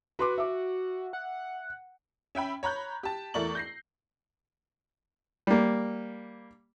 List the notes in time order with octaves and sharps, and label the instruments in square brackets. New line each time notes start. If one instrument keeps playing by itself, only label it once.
[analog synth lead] F#4 [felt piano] B4 C6 D6
[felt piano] E5 D6
[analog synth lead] F#5
[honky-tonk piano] C#4 E5 G5 B5
C#5 A#5 B5 F#6 G6
G4 A5
E2 A3 A#4 D5 C#6 F#7
G6 A#6 C7
[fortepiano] G3 A#3